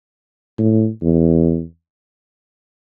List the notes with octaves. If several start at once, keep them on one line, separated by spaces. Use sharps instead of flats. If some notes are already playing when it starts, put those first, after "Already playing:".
A2
E2